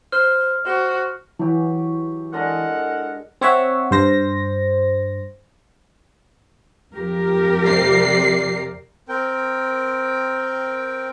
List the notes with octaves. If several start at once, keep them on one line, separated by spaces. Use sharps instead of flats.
C5 F6
F#4 C5
E3 F#3 E4 G4
G#3 D4 A4 A#4 D#5 F#5
C4 C#5 E5 F#5
G2 C5 A#6
F2 G4 A#4
C3 D5 C7
C4 A#4 G5